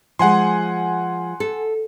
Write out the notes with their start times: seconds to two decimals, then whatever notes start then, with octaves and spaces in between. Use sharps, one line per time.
0.19 F3 G#3 F#5 G#5 C6
1.40 A4